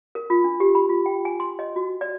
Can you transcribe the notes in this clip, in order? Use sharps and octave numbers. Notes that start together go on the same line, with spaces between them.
A#4
F4
D4
G4
B5
F4
G5
G#5
C6
D#5
F#4
D5